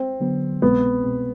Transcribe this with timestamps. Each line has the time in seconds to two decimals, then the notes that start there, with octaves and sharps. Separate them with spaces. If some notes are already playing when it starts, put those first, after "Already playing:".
Already playing: C4
0.20 D3 F#3 B3
0.62 C2 B2 G#3 B3 C4
1.03 C2 B2 G#3 C4